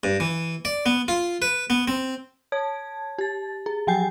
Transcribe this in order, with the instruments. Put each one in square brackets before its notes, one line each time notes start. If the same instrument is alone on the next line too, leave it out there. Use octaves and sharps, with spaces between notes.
[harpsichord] G2
E3
D5
B3
F4
B4
B3
C4
[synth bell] C#5 A5 G#6
G4 A6
G#4
F3 F#3 G5 G#5 G6 C7